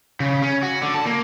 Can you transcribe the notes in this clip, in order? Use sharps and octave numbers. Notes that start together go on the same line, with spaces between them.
C#3
C#4
F#4
D3
A5
A#3